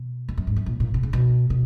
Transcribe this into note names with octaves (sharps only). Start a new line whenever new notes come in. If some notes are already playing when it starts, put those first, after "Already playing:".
Already playing: B2
F2
F#2
G#2
F#2
A#2
A#2
B2
C#3
B2
B2